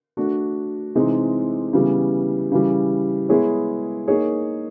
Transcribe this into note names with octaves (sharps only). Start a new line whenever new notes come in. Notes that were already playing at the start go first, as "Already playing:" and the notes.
A3 D4 F#4
C3 E3 G#3 C4 D#4
C#3 E3 G3 B3
C#3 E3 G3
G#3 B3 E4 G#4 C#5
A#3 D#4 G#4 C#5